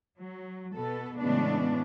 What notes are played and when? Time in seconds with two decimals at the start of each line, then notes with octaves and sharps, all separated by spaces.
0.16 F#3
0.74 B2 B3 A4
1.18 A2 C#3 E3 G#3 B3 D4